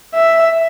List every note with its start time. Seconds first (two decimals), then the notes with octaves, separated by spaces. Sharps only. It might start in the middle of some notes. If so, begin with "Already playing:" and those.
0.14 E5